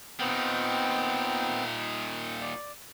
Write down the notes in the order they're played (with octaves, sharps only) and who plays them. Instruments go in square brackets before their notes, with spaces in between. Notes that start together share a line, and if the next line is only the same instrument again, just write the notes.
[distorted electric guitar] A#2 D#3 [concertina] B3 C4 G5
[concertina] D5